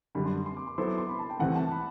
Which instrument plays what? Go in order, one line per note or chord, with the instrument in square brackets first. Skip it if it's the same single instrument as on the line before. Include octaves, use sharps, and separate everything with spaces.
[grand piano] F#2 D3 G3 [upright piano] B5
[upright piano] C6
C6
D6
C6
[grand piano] F#3 B3 E4 A4 C5 [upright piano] C6
[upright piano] D6
C6
B5
A5
G5
[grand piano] C2 C3 E3 A3 [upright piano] F#5
[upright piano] A5
B5